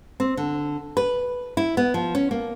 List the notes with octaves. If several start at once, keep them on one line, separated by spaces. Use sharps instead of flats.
C4
D3
B4
E4
B3
F3
C#4
A#3